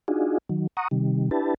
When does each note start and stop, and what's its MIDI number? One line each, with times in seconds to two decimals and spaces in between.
0.08 0.38 62
0.08 0.38 63
0.08 0.38 65
0.08 0.38 66
0.08 0.38 68
0.49 0.67 51
0.49 0.67 54
0.77 0.88 78
0.77 0.88 82
0.77 0.88 85
0.77 0.88 87
0.91 1.30 48
0.91 1.30 51
0.91 1.30 55
1.31 1.54 62
1.31 1.54 64
1.31 1.54 67
1.31 1.54 71
1.31 1.54 81